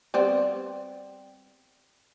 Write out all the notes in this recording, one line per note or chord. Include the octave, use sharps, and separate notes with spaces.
G3 B3 C4